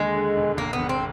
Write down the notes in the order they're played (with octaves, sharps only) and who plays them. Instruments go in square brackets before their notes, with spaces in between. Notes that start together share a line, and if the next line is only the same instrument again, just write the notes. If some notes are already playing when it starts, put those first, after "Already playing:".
Already playing: [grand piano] D#2 D3 [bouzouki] G#3
[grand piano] D3
E1
[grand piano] G#1 [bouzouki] A#3
[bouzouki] B3
[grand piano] G#1
[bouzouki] C4